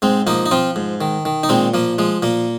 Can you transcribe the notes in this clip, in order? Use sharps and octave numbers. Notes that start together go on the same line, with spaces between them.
G#2 G#3 C4
F3 A#3 D#4
D#4
F3 C4 F4
G#2
D#3
D#3
D#4
A#2 G#3 C4
F3 A#3
F3 G#3
A#2 A#3